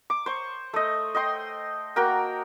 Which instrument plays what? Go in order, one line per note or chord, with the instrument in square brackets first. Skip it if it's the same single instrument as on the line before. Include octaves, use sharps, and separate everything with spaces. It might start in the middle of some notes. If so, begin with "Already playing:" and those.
[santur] D6
C5 C#6
A3 D#5
D#5 G5 C6
A#3 F#4 A#4 G5